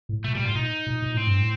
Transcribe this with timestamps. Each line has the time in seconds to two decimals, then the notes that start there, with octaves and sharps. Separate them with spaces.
0.09 A2
0.24 A#2 A3
0.35 A#2 G3
0.45 A2 F4
0.55 A#2 D#4
0.86 A#2
1.02 A#2
1.14 A2 C4
1.27 G2
1.40 A2